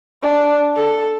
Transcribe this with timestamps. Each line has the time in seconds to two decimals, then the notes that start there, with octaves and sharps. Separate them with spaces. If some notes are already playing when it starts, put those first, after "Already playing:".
0.23 D4
0.76 A4